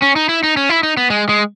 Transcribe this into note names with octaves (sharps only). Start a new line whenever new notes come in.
C#4
D#4
E4
D#4
C#4
E4
D#4
B3
G#3
G#3